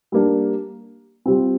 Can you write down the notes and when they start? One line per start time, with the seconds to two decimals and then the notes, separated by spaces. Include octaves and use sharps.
0.12 G3 A#3 D4
1.26 C3 G3 C4 F4